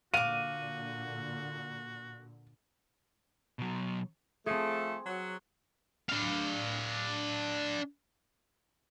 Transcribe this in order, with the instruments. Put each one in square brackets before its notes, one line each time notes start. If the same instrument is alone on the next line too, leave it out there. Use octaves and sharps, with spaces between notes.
[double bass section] A#2 D3 [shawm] F#4 [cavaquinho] F5 D6 [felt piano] D#7
[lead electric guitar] B2 F#3
[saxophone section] F3 A3 [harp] C4 G#4
[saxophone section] F#3
[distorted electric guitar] D4 F5